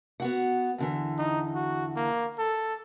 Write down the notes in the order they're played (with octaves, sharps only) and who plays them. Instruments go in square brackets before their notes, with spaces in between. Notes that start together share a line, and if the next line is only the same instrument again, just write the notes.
[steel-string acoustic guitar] B3 F#4 F#5
E2 D3 E3
[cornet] D#4
F#4
A#3
A4